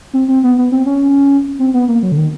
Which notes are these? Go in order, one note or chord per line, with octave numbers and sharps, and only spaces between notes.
C4
C4
B3
B3
C4
C#4
C4
B3
A#3
F#3
D3
D#3